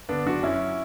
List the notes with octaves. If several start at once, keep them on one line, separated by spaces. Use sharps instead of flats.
D3 B3 D4
F#1 D4 F#4
F#2 C#4 E4